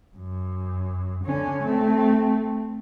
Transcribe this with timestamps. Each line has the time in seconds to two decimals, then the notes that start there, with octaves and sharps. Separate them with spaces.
0.17 F#2
1.25 D3 C#4
1.64 A3 C4